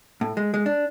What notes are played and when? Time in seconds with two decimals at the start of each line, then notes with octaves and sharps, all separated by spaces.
0.21 A2
0.37 G#3
0.54 G#3
0.66 D4